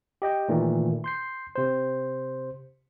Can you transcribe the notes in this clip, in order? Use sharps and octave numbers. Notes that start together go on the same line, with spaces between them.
G4 D#5 G5
A#2 D#3 E3 A3
C6 G6 C7
C3 C5